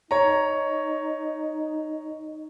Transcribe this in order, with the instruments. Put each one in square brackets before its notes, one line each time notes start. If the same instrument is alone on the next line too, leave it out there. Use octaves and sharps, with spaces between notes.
[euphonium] D#4 [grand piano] C#5 A#5